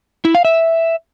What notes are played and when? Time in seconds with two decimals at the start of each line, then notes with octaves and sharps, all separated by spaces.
0.25 E4
0.35 F5
0.45 E5